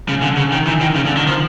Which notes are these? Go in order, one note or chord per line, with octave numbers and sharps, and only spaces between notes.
C#3
D3
C#3
D#3
E3
D#3
C#3
D3
D#3
F3